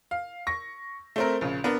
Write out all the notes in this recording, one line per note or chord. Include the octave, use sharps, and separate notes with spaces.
F5
C#6 A#6
A3 C4 A#4
A#1 C#3
B3 D4 A#4